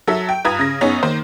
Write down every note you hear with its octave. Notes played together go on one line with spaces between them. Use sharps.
F#3 A4 E5
G5
G2 F4 B4 A#5 D#6 G#6
C#3 A#6
F#2 B3 D#4 G#4 C#5
D#3 A#3 C5